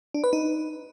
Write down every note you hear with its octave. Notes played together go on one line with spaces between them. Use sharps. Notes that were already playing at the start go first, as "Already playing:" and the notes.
D4
B4
D#4